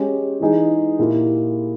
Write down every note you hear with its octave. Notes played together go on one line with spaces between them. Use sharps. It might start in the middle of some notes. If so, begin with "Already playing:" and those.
Already playing: G#3 C#4 G4
E3 G#3 D#4 G#4
A#2 A#3 E4 G4